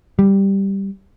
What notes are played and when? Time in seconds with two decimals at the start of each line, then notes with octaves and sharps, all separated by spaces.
0.19 G3